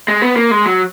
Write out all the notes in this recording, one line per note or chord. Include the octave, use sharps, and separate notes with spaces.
G#3
B3
A#3
G#3
F#3